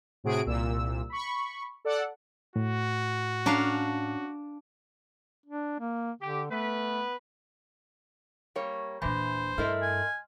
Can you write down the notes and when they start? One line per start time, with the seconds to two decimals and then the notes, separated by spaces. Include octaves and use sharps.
0.24 A2 C3 F#4 G#4 D7
0.46 C2 A#2 E6
1.10 B5 C#6
1.85 A4 D5 F#5
2.56 A2 F#4
3.46 C#4 D4 F5 A#5
5.46 D4
5.80 A#3
6.22 D3 G4
6.51 A3 B3 B4
8.56 G3 A#3 C#5
9.02 D#1 A#2 E3 D4 C5 B5
9.58 G2 A3 E4 A#4 D#5 C6 F6
9.82 G#5